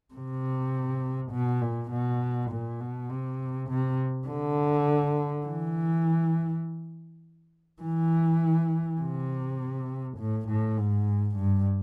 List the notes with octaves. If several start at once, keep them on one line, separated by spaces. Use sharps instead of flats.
C3
B2
A#2
B2
A#2
B2
C3
C3
D3
E3
E3
C3
A2
A2
G#2
G2